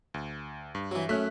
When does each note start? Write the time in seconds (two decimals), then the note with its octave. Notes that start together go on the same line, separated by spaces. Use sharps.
0.14 D2
0.75 G2
0.91 E3 F#3
1.09 F#2 A3 C#4 F#6 B6